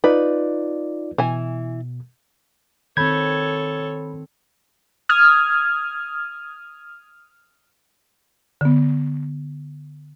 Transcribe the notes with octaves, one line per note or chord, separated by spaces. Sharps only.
D#4 F4 B4 D5
B2 E3 G#5
D#3 C4 A4 C#5 B5 G6 G#6
D#6 F6 G#6
D3 B3